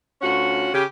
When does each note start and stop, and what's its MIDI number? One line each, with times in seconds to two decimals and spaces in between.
0.22 0.69 38
0.22 0.69 61
0.22 0.69 65
0.22 0.69 66
0.22 0.69 78
0.73 0.84 49
0.73 0.84 67